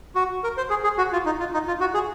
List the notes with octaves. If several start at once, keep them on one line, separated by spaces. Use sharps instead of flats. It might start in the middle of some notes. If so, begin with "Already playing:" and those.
F#4
A#4
C5
G#4
G#4
F#4
F4
D#4
F4
D#4
F4
F#4
G#4